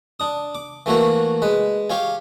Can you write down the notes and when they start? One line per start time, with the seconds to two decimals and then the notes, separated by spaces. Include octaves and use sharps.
0.20 D4 D#6
0.55 D6
0.86 E3 A3 A#3 F#4 C#5
1.42 G#3 B4
1.90 G4 C#5 F5 G#5